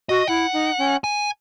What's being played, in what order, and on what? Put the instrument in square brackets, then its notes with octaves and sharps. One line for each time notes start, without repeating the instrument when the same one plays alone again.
[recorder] F#4 [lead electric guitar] D#5
[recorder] E4 [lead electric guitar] F#5
[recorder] D#4
C#4
[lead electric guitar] G#5